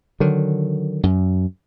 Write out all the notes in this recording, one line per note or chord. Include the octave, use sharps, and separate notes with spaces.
D3 D#3 F#3
F#2